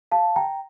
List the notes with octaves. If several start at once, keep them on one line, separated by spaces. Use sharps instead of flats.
F5 A5
G5 A#5